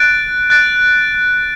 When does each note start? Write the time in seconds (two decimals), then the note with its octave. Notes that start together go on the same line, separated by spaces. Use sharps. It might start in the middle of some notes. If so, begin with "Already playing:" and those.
Already playing: F#6 A6 D7
0.50 F#6 A6 D7